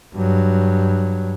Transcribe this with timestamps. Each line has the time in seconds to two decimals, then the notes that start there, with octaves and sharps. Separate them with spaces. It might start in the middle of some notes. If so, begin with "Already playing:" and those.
0.15 G2 F#3